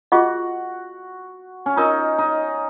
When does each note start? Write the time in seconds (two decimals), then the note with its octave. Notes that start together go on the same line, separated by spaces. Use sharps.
0.12 F4 F#4 G#4 D#5 F#5 C#6
1.66 C#4
1.76 D#4 F4 A#4 D#5 A#5 C#6
2.18 D#4